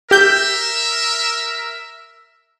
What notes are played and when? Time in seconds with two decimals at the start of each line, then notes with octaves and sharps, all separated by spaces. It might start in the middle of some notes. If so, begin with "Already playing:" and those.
0.11 G4 A#4 E5 G6